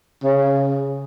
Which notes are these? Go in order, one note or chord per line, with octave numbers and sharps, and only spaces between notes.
C#3